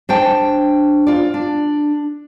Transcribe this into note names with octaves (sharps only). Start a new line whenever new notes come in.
D4 C5 G5 A5
F4 D5
D4